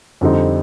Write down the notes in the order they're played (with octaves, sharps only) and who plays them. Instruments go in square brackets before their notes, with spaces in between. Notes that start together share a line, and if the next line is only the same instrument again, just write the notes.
[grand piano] F2 D3 G3 C4 D#4